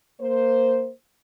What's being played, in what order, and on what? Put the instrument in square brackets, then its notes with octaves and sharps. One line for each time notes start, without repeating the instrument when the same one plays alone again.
[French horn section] A#3 C5